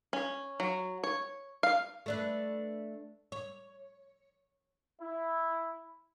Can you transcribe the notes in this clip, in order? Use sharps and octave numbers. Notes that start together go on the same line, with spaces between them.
C#4
F#3
C#5
F5
A3 D4 B4
C#5
E4